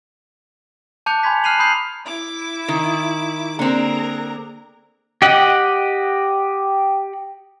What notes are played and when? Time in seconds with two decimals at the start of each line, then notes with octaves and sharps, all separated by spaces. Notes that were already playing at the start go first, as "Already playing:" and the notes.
1.06 A5 D6 F#6 G6 C#7 F7
1.23 G#5 B5 C6 G#6 B6
1.44 F6 F#6 C7 D#7 F7 F#7
1.59 A#5 B5 D#6 G6 C7 F#7
2.05 E4 D6
2.69 D#3
3.59 D3 A#3 C4 G#4 A#4 A#5
5.22 G4 D#5 F#5